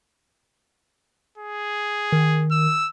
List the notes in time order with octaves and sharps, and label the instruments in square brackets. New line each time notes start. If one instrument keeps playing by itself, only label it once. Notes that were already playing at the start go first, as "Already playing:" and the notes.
[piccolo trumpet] G#4
[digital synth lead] D#3
[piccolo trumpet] E6